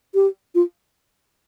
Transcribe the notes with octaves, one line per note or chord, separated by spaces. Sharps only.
G4
F4